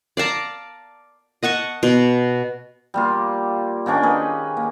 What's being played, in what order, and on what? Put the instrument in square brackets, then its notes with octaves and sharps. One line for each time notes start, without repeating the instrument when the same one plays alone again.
[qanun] D5 F5 A5 A#5
D#5 F#5 A5 C#6
B2
[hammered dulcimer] G3 A#3 F4
D#3 A#3 C#4 D4
D#4 G#4 B4
A#3